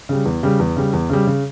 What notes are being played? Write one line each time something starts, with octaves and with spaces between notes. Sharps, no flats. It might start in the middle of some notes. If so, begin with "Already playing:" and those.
C#3 G3
E2
C#3 G3
E2
C#3 G3
E2
C#3 G3
C#3